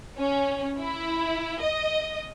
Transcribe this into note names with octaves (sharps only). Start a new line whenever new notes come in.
C#4
E4
D#5